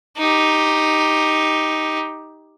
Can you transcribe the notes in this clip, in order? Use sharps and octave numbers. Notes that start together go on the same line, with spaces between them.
D#4 G4